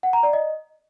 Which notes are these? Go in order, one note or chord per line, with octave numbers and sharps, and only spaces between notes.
F#5
A#5
D5
D#5